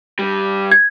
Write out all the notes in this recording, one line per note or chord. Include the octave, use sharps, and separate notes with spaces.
G2 G3
G#6